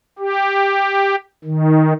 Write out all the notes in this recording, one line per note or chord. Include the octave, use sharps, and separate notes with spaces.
G4
D#3